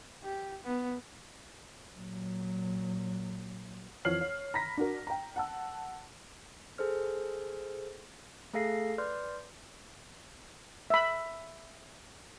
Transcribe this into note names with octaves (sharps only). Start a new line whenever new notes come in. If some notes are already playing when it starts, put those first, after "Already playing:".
G4
B3
A#2 F#3
F2 E3 C#5 F6 C7 F#7
C#5
A#5 B5 A#6 B6
D4 F#4 A#4
G5 A#5
F#5 A5 E6
G#4 A4 C5 F6
A3 G#4 A4 F5 A#6 C7
B4 D5 C6 F6 G6
E5 B5